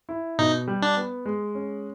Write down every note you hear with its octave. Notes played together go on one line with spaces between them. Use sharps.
E4
B2 D#4
G3
D4
B3
G#3
C#4